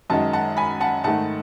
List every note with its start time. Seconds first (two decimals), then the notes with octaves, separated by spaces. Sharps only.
0.10 F#2 D#3 G#3 F#5 A5
0.33 F#5 A5
0.57 G#5 B5
0.81 F#5 A5
1.04 G#2 D#3 A3 F#5 A5